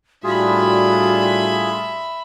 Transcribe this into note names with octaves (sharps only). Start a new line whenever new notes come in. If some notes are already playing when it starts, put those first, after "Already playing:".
A2 G3 D4 F4 F#4 G#4 E5 B5